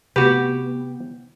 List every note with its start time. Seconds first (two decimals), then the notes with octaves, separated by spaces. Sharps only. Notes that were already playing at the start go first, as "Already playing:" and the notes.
0.16 C3 A3 B3 F#4 G4 B4